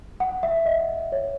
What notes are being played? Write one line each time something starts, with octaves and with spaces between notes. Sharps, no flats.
F#5
E5
D#5
C#5